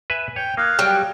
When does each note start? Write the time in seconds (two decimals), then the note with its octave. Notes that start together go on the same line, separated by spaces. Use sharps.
0.10 B4 E5 G#5
0.36 C#5 G5
0.57 A#3 F5 D#6 F#6 G#6
0.79 F#3 G3